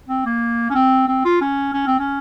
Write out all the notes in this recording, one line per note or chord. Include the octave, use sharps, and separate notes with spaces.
C4
A#3
C#4
C4
C4
F4
C#4
C#4
C4
C#4